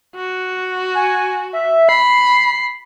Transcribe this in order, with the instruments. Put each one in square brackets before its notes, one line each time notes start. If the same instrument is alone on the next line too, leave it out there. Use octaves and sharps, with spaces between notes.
[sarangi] F#4
[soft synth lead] G#5
E5
[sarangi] B5 [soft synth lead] C7